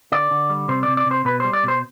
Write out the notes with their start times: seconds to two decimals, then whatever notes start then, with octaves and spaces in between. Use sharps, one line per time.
0.12 D3 D5
0.31 D3
0.50 G3
0.68 C3 C5
0.83 C3 D5
0.97 D5
1.06 C3 C5
1.25 B2 B4
1.40 G3 C5
1.53 D5
1.64 B2 C5